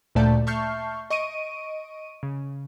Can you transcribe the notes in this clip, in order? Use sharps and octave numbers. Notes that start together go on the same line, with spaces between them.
D2 A#2 A3 D5 A5 G6
E5 A5 C#6 F6 G6 C7
D#5 C#6 D7 D#7
C#3